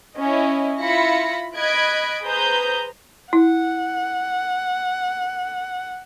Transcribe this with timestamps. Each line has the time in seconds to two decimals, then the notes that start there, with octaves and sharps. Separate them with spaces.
0.17 C#4 E4 D#5
0.80 E4 F4 B5 A#6 C#7
1.57 D#5 B5 F#6 G#6 D7
2.23 G#4 B4 C5 A#5 D#6 G6
3.33 E4 F#5